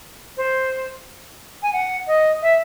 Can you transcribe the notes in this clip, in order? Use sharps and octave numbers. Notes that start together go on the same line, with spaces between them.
C5
G#5
F#5
D#5
E5